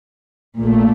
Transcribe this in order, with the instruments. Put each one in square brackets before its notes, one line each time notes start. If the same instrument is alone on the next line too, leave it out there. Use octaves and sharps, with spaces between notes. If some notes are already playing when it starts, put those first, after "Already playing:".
[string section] A#1 A#2 A3